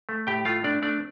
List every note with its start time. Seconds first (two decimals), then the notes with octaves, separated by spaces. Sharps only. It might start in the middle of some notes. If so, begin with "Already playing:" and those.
0.09 A3
0.27 A2 G4 G5
0.45 A3 F4 F5
0.64 A3 D4 D5
0.82 A3 D4 D5